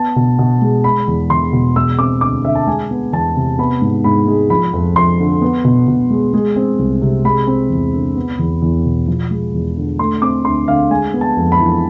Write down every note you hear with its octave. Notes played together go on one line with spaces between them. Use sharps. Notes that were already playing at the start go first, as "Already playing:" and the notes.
Already playing: B3 A5
B2
B2
G#3
G#3 B5
E2
E2 C6
B2
G#3 E6
C4 D6
D2 D6
D3 E5
A5
G#3 G#5
B3
E2 A5
C3
B3 B5
G#2
G#2 B5
G#3
F3 B5
F2
F2 C6
D3
B3
B2
B2
G#3
G#3
C4
C2
C3
G#3 B5
C4
E2
D3
B3
E2
E2
B2
F3
G#3
E2
D3
A3 C6
C4 D6
D2 C6
D3 F5
G#3 G#5
B3
A5
F2
B5
E3